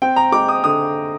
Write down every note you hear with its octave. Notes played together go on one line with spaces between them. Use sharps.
C4 G5
A#5
G#3 D6
D#6
D3 D#6